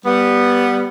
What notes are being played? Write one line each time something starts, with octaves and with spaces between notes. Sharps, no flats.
G3 B3